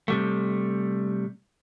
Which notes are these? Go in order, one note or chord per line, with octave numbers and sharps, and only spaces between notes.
C3 G3 A3